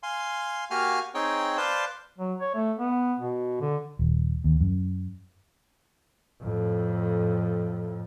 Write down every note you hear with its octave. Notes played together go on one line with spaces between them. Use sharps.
F5 G#5 C6
A#3 F#4 G4 F5 G#5 F6
C4 D#4 G#4 C#5 G5
B4 C5 D5 F5 A5 C6
F#3
C#5
A3
B3
B2
D3
D#1
D#2
F#2
F2 A2